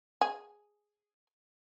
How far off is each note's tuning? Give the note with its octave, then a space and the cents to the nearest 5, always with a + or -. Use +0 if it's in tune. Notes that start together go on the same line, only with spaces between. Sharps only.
G#4 +0 G#5 +0